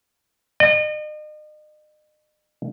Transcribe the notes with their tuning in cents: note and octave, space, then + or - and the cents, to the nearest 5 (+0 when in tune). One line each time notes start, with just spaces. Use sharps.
D#5 -40